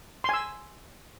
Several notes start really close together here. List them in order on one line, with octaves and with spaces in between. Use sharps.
C6 G#5 E6